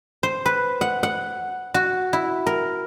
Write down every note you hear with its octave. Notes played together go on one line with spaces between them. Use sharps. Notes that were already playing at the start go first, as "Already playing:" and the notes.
C5
B4
F#5
F#5
F#4
E4
A#4